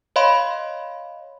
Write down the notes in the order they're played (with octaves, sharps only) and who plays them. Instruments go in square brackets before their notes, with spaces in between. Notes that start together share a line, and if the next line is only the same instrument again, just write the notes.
[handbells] C#5 D#5 F5 B5 C6